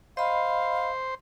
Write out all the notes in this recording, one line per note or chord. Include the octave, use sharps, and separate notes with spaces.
C5 D#5 F5 B5